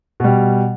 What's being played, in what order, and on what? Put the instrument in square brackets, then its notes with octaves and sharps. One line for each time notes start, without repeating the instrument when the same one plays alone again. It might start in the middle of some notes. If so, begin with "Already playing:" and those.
[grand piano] B2 G3